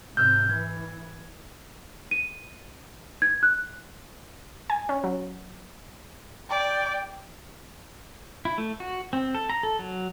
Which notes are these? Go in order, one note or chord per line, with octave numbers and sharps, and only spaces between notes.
G#2 C3 E6 F6 G6
E3 G#6
D#7
G#6
F#6
G#5
C#4
F#3
D5 G5
E4
A3
F#4
C4
A4
A#5
A4
F#3